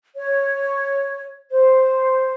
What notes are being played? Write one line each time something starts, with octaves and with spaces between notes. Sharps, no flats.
C#5
C5